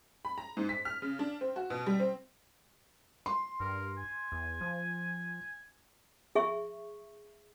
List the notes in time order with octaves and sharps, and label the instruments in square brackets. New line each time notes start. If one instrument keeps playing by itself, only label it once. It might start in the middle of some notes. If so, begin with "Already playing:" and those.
[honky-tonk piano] B5
A#5
G#2
B6
F6
C#3
D4
C4
F#4
B2
G3
C4
[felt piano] C6
[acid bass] G2 [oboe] A#4
[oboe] G#5
[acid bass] E2
F3
[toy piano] G#4 E5 C#6